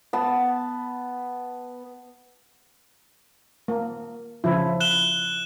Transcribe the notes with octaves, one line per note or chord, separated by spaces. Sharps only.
B3 A5
A#3
C#3 F3 E4
F#6 E7 G7